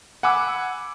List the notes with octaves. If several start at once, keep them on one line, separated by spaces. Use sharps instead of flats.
F#5 G#5 B5 D6 E6